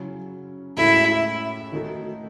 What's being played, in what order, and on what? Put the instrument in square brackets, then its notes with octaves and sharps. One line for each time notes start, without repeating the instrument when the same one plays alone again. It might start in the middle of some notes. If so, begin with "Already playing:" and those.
Already playing: [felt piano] C#3 F#3 C#4 E4
[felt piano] A2 G#3 C#4 F#4 A4 [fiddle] E4
[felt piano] D#3 A3 D#4 F#4 A4